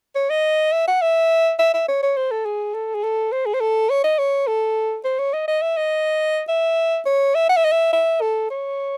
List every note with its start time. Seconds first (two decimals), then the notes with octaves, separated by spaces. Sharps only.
0.15 C#5
0.30 D#5
0.72 E5
0.88 F#5
1.02 E5
1.59 E5
1.74 E5
1.88 C#5
2.03 C#5
2.17 C5
2.31 A4
2.46 G#4
2.74 A4
2.95 G#4
3.03 A4
3.32 C5
3.46 G#4
3.54 C5
3.61 A4
3.90 C#5
4.04 D#5
4.18 C#5
4.47 A4
5.05 C5
5.19 C#5
5.33 D#5
5.48 D#5
5.62 E5
5.77 D#5
6.49 E5
7.06 C#5
7.35 E5
7.49 F#5
7.57 E5
7.65 D#5
7.72 E5
7.93 E5
8.21 A4
8.50 C#5